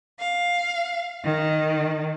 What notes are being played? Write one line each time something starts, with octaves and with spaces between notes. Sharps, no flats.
F5
D#3